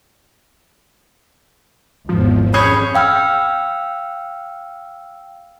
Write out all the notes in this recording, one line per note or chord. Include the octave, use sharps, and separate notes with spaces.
G#1 E2 F3
F2 C#4 G#4 C#5 B5 G6
F5 G5 E6 F6